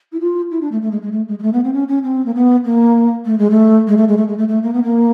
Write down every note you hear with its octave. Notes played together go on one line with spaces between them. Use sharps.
E4
F4
E4
D4
A3
A3
G#3
G#3
A3
G#3
G#3
A3
B3
C4
C#4
C#4
C4
A#3
B3
A#3
A3
G#3
A3
G#3
A3
G#3
A3
G#3
A3
A3
A#3
B3
A#3